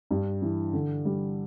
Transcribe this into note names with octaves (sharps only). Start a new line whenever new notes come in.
G2
E3
D3
G3